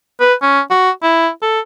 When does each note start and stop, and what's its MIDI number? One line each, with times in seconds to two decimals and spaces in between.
0.20 0.34 71
0.42 0.60 61
0.70 0.90 66
1.02 1.28 64
1.42 1.60 69